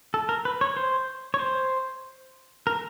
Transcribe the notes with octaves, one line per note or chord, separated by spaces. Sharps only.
A4
A#4
B4
C#5
C5
C#5
C5
A#4